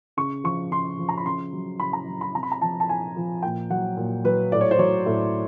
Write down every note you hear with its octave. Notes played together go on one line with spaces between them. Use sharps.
C#3 C#6
F3 C#6
C#3 C6
F3
A#5
B5
C#3 C6
F#3
C#3 B5
A#5
F#3
B5
C3 A#5
B5
A#5
F3 A5
A5
C3 G#5
F3
A#2 G5
F#3 F#5
A#2
F#3 B4
A2 D5
C#5
C5
F#3 C#5
A2